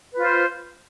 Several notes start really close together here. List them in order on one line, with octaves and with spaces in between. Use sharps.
B4 F4 C5